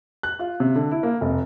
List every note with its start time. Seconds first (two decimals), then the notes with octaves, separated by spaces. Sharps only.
0.23 F#6
0.39 F4
0.60 C3
0.76 D3
0.91 E4
1.03 A#3
1.21 F1